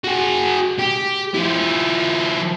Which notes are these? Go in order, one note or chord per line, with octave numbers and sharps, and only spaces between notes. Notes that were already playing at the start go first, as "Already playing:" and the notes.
F#4 G#4
G4
F3 E4